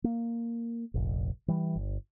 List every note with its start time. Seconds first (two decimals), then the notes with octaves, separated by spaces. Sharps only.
0.04 A#3
0.94 F1 A#1
1.48 E3 G3
1.75 G1